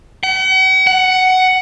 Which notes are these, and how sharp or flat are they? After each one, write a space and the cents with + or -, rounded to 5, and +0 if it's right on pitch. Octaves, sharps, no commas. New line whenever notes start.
F#5 +45
F#5 +10